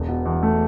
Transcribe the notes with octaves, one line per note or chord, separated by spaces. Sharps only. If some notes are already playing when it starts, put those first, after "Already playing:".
Already playing: E1
B2
E2
A3